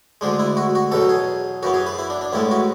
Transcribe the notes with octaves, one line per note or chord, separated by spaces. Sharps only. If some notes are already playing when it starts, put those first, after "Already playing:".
D2 D3 G#3 D4
E4
F#4
F#4
E2 B2 F#3 A4
G#4
F#2 E3 B3 F#4
G#4
B4
E4
D4
D4
A1 A2 G#3 B3 E4
F#4